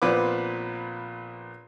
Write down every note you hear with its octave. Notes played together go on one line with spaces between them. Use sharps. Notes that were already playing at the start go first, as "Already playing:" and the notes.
A#1 A#2 B3 C4 B4 D6